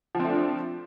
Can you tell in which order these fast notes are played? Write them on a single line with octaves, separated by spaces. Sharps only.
F3 C4 A3 D4